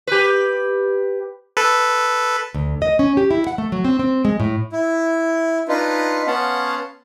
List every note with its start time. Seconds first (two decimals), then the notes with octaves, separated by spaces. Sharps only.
0.07 G4 B4
1.57 A4 B4
2.54 D2
2.82 D#5
2.99 C#4
3.17 G4
3.31 E4
3.47 F#5
3.58 A3
3.72 F#3
3.85 C4
3.99 C4
4.25 G#3
4.40 A2
4.72 E4
5.69 D4 D#4 F4 B4
6.27 B3 C#4 F5 F#5 A5 C6